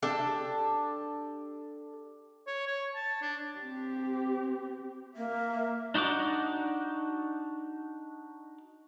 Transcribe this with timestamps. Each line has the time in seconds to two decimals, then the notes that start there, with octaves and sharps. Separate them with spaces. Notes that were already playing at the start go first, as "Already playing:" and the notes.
0.03 D4 G4 A4
2.47 C#5
2.67 C#5
2.95 A5
3.22 D4
3.58 C4 G4
5.17 A#3 E5
5.94 D4 D#4 F#4 F#5 D6